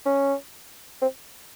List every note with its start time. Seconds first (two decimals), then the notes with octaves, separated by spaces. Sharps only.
0.06 C#4
1.02 C4